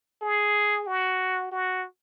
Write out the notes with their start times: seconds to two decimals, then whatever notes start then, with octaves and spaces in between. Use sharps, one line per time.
0.22 G#4
0.87 F#4
1.52 F#4